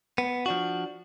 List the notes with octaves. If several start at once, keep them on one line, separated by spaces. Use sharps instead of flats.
B3
F3 D4 F#4